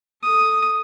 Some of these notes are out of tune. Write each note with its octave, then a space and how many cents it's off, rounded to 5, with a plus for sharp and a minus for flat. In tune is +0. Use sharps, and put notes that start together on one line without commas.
A4 +0 D#6 +0